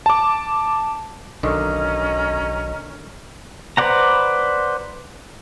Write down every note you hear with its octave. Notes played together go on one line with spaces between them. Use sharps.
A5 D6
B1 D3 D#3 C#4 D#5 A#5
B4 C5 D5 F#5 A#5